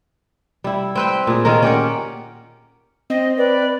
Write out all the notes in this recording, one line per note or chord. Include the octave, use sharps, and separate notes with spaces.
G3 E4
C4 B4 G5
A#2 G#4
D#3 C#4 F4 A#4
C#4 G4 D5 F#5
C4 D#5
B4 D5